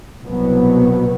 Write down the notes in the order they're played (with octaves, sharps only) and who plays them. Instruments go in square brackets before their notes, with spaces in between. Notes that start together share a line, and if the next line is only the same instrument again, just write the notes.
[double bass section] C2 B2 F#3 B3